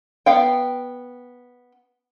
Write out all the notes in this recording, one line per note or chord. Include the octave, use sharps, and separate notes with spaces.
B3 F5 G5